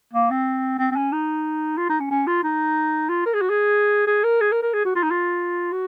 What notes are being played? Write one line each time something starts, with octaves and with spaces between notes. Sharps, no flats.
A#3
C4
C4
C4
C#4
D#4
F4
D#4
C#4
C#4
F4
D#4
F4
A#4
G#4
F#4
G#4
G#4
A#4
G#4
A#4
A#4
G#4
F#4
F4
D#4
F4
F#4